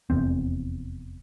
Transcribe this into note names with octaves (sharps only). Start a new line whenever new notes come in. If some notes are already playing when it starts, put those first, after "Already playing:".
F1 E2 C4